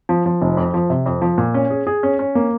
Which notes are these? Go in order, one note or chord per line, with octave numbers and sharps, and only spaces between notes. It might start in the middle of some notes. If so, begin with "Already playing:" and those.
F3
F3
F1
F2
F3
C3
F2
F3
A#2
C#4
G#4
G#4
C#4
C#4
A#3